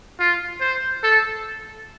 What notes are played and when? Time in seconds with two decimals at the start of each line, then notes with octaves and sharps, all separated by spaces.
0.20 F4
0.61 C5
1.03 A4